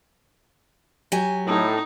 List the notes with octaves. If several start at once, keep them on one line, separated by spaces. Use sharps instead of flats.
F#3 G4 G#5
A2 D#4